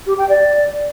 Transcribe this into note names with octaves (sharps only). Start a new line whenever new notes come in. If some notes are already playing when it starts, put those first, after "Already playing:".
G4
G5
D5